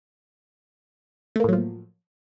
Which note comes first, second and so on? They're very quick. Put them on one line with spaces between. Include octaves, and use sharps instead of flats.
A3 A#3 A2 F#3 F3